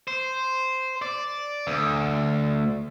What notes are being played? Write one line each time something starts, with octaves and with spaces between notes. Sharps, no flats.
C5
D5
D2